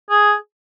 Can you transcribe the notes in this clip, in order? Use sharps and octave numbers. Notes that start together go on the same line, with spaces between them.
G#4